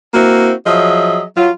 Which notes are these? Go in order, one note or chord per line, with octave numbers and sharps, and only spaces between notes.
A#3 C4 E4 F#4
F3 F#3 G#4 D#5 E5
F#3 F4